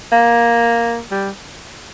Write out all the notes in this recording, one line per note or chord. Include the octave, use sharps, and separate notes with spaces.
A#3
G3